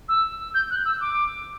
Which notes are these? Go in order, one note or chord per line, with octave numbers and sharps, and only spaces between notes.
E6
G6
F#6
E6
D6